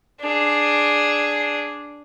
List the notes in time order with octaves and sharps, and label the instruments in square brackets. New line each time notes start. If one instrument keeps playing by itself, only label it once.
[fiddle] D4 G#4